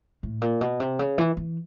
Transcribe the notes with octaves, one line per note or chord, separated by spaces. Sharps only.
A2
A#2
B2
C3
C#3
E3
E3